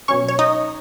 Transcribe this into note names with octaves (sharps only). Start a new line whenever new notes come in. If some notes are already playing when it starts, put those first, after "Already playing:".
B2 F#3 C#4 C#5 C#6
C#5
D#4 D#5